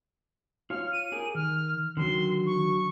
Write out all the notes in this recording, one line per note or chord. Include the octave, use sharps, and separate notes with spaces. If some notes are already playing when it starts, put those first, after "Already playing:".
F4 C#5 F5 F6
D#7
G4 G#4 A#4
D#3 F6
D3 D#3 F#3 C6
C#6